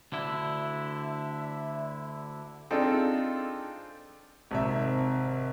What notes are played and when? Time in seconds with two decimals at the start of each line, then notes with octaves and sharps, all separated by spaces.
0.12 D2 D3 E4 E5
2.71 C4 D4 D#4 F4 G#4 A4
4.51 G#1 C3 E5